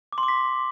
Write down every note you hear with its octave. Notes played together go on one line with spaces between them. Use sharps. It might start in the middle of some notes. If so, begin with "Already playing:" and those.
D6
C6
D6
B6